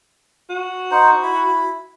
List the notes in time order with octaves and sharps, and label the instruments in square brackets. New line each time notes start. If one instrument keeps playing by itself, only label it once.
[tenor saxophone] F#4
[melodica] D#4 C5 F#5
E4 B5